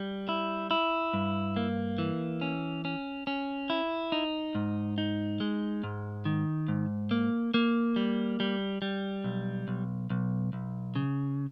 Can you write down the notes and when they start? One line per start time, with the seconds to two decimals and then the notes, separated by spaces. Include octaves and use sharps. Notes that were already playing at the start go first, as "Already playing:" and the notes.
Already playing: G3
0.29 E4
0.71 E4
1.14 G2
1.56 A#3
1.98 E3
2.41 C#4
2.85 C#4
3.27 C#4
3.70 E4
4.12 D#4
4.55 G#2
4.98 D#4
5.40 G#3
5.84 G#2
6.25 D#3
6.68 G#2
7.11 A#3
7.54 A#3
7.96 G3
8.40 G3
8.82 G3
9.24 B1
9.68 B1
10.10 B1
10.53 B1
10.96 C#3